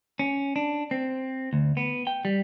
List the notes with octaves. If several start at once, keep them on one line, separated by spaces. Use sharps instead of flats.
C#4
D4
C4
D2
B3
G5
G3